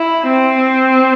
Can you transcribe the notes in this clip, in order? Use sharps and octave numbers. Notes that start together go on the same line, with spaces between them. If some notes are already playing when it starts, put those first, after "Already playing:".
Already playing: E4
C4